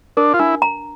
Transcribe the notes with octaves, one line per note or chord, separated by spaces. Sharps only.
D4 A#4
F4
D4 E4
A#5